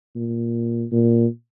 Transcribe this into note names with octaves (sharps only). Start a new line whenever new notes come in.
A#2
A#2